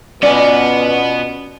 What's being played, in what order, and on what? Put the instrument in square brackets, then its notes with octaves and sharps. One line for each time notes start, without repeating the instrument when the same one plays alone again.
[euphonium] B2 [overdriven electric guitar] B3 B4 [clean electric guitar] C#4 F4 G#5 [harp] D5